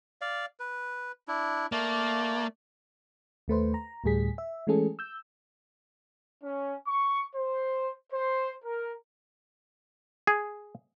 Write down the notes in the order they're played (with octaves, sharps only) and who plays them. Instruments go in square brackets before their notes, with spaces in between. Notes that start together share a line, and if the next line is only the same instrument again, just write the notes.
[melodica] D5 F5
B4
D4 E4
[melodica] A3 D5 [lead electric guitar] A#3
[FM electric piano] D#2 A3 B4 C5
A#5
D2 A2 G3 G#4 B6
E5
E3 G#3 A3 C#4 G#4 A4
E6 G6
[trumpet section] C#4
C#6
C5
C5
A#4
[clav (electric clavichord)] G#4